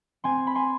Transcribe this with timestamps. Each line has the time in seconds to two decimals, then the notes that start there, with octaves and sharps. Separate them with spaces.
0.24 C4 G#5 C6
0.47 B5
0.55 G#5 C6